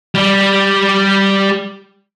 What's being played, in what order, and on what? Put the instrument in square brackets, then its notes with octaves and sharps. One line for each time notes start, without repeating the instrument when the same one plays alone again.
[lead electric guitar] G3 G4